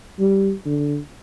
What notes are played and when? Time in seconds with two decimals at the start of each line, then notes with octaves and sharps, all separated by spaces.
0.20 G3
0.66 D3